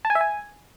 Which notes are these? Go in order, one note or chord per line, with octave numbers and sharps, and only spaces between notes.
A5
G#5
E5
G#5